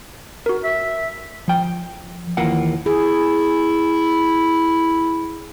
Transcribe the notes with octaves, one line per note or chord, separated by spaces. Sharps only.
F#4 A#4
E5
F3 G5
D#2 E3 A#3 F4 F#5
E4 G#4